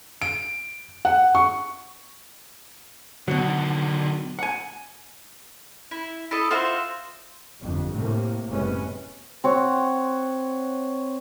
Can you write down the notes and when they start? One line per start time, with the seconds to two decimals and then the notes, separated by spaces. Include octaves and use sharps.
0.22 D7
1.05 F#5
1.35 C#6
3.28 B2 D3 D#3 F#3
4.39 F#5 G#5
5.91 E4
6.31 E4 A4 D#5
6.51 F4 F#4 C5 E5
7.62 G1 F2
7.93 A2 C3 A#3
8.48 F#1 C3 G#3 B3 C#4
9.44 C4 C#5 F#5